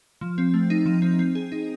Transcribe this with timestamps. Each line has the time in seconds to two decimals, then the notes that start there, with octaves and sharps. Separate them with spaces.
0.21 F3
0.38 C4
0.54 A3
0.70 D#4
0.86 F3
1.02 C4
1.19 C4
1.35 G#4
1.52 D#4